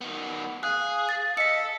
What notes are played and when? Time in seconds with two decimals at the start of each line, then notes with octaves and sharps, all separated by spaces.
0.01 D#3 B3
0.63 G#4 F5 F#6
1.09 A6
1.37 A4 D#5 B6 C#7